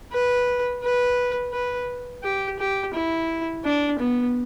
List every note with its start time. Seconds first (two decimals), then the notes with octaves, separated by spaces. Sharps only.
0.12 B4
0.83 B4
1.53 B4
2.23 G4
2.59 G4
2.94 E4
3.64 D4
3.99 B3